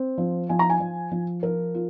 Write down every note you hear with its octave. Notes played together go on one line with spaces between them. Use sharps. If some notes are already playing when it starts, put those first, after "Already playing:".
Already playing: C4
F3
F3 G#5
A#5
G#5
F3
F3
F3 A#4
F4